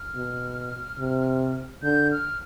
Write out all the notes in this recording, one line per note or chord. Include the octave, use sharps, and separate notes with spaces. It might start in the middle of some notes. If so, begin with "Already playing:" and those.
Already playing: F6
B2
C3
D3 G6
F6